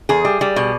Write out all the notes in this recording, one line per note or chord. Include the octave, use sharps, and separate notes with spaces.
E2 G#4
G3
G3
B2